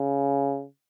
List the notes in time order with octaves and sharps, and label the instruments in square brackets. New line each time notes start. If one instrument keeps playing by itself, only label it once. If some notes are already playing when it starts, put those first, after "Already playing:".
Already playing: [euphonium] C#3